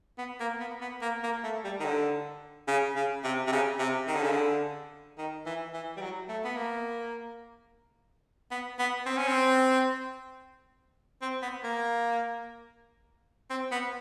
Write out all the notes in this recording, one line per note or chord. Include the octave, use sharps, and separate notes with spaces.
B3
A#3
B3
B3
A#3
A#3
A3
G3
D#3
D3
C#3
C#3
C3
C3
C#3
C3
D#3
D3
C#3
D3
D#3
E3
E3
G3
F#3
A3
B3
A#3
B3
B3
C4
C#4
C4
C4
B3
A#3
C4
B3